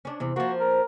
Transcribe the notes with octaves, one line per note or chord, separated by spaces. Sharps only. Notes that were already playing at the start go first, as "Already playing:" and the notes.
C#4 D4
E2 C3
F3 A#3 F#4
A#4